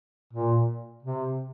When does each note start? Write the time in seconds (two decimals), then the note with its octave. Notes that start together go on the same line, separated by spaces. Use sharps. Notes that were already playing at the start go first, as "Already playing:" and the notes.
0.33 A#2
1.03 C3